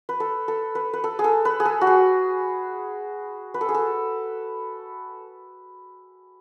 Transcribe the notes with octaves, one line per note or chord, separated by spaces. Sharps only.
B4
A4
A4
B4
B4
A4
G#4
A4
B4
G#4
A4
F#4
G#4
B4
A4
G#4
A4